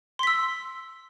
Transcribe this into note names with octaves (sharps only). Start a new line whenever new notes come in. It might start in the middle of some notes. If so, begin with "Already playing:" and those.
C6 E6 B6